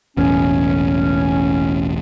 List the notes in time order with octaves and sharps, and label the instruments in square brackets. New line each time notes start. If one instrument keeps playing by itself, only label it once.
[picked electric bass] E1 A1 E2 [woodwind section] C#4